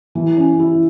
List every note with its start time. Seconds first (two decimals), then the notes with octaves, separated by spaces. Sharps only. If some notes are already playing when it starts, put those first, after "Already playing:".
0.15 E3
0.37 C#4
0.59 E4